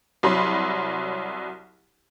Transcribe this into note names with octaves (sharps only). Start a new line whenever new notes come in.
C2 F#3 B5 C6